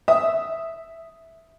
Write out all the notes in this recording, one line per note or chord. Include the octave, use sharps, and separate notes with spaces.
E5 D#6